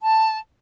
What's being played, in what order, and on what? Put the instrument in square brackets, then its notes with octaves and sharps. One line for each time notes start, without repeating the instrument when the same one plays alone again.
[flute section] A5